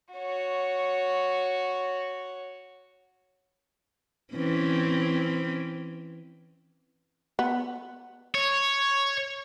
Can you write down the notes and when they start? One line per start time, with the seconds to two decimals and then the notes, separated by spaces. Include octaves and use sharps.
0.14 F#4 C#5
4.34 E3 C4 C#4
7.39 B3
8.35 C#5